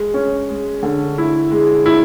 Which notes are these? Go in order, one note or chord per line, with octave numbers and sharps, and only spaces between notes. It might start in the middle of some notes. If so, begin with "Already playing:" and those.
Already playing: G#3
C#4
G#3
D3
E4
G#3
E4